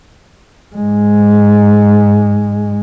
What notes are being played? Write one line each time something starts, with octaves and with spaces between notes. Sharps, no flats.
G#2 G#3